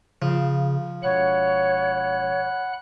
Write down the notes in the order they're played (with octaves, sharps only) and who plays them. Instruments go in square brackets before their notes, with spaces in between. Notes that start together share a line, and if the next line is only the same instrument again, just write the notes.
[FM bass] C#3 [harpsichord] F3
[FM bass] E1 [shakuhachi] C#5 [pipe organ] F#5 B5 F#6